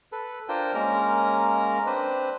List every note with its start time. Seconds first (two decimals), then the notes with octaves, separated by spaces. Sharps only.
0.12 A4 B4
0.49 D4 F4 A#4 C5 G5
0.74 G#3 A#3 C#4 A#4 A#5
1.86 C4 D4 B4 C5